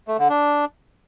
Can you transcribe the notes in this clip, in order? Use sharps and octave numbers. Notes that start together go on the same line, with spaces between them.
A3
D3
D4